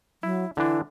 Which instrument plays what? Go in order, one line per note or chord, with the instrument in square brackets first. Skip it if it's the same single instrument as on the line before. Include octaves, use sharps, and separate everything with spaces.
[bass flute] F#3 [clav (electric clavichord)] E4
[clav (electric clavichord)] D3 E3 D4 [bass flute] E4